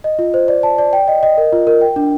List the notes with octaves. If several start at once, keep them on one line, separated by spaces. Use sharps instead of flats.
D#5
F4
C5
D5
A5
D5
G5
D#5
D#5
A#4
F4
A#4
G5
D4